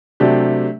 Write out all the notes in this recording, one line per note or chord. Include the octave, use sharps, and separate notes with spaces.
C3 F#3 A3 D4 G4